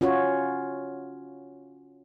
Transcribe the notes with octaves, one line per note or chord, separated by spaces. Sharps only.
C#4 F4 F#4 C#5